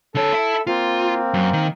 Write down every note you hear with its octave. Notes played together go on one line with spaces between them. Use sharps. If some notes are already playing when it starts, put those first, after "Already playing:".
D3 A4 C#5 E6
E4 E5
A#3 C4 F4
F#2
D#3